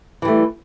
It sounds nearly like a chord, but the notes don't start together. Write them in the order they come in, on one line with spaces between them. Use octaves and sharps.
E3 G3 A3